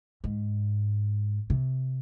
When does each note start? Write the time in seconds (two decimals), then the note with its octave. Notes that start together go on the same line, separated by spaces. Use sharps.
0.24 G#2
1.50 C3